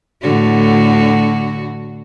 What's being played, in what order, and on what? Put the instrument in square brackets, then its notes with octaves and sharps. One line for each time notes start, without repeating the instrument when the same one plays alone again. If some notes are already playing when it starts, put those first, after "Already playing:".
[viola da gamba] A2 D3 F#4